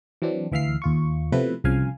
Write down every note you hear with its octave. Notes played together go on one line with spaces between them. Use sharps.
E3 F#3 C4 D4
D2 E3 E5 F5 F6 C7
D#2 F4 C#6
C3 F3 A3 B3 E4 B4
C2 C#3 F3 F5 G#5